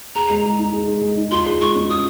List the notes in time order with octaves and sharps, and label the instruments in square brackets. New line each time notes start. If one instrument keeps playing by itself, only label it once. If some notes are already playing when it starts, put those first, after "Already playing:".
[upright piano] G#4 [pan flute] A#5
[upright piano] G#3
G#3
D#4
G#4
G#3
G#3
D#4
[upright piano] F4 [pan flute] C6
[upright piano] G#4
[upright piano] G#3 [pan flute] C#6
[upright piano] C#4
[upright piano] F4 [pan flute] D#6